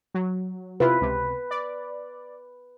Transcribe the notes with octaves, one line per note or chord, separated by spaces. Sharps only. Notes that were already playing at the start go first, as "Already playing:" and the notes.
F#3
C3 E4 F4 B4
C#2 C3
D5